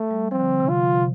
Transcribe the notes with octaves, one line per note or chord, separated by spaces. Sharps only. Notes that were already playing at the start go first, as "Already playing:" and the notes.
Already playing: A3
G3
F3 C4
D3
D3
C3
D3 F4
F3
C3